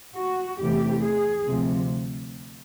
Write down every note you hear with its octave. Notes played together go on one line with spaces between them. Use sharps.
F#4
E2 C3 E3 A3 G4
G#4
D2 C3 F3